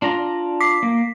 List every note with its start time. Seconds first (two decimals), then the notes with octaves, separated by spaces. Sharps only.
0.02 D4 F4 A#5
0.60 D6 B6 C7
0.83 A#3